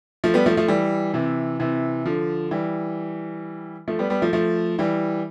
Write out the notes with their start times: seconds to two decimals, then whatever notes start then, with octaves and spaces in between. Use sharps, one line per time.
0.24 F3 A3
0.34 G3 B3
0.46 F3 A3
0.57 F3 A3
0.68 E3 G3
1.14 C3 E3
1.60 C3 E3
2.05 D3 F3
2.51 E3 G3
3.88 F3 A3
3.99 G3 B3
4.10 G3 B3
4.22 F3 A3
4.33 F3 A3
4.79 E3 G3